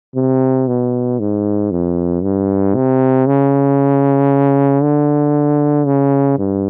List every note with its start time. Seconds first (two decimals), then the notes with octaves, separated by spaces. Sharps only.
0.15 C3
0.68 B2
1.19 G#2
1.71 F2
2.23 G2
2.75 C3
3.27 C#3
4.83 D3
5.86 C#3
6.38 G2